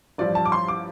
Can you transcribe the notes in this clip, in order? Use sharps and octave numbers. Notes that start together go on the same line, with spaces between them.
A1 G2 F3 D5
A5
D6
C6
D6